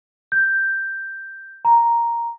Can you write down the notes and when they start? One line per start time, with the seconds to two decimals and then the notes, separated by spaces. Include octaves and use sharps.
0.32 G6
1.65 A#5